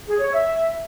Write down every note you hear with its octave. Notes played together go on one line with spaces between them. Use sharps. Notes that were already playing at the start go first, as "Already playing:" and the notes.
G#4
C#5
E5